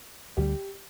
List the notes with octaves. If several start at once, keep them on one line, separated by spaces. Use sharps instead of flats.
D2 D3 G3 G4